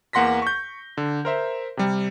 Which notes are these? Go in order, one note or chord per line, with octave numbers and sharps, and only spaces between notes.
E2 A#3 F#5 C6 A#6 B6
C#6 G6
D3
A#4 C5 E5
C3 G3